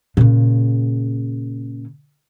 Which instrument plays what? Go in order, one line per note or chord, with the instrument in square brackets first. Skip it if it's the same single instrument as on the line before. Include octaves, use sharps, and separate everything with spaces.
[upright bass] A#2 C#3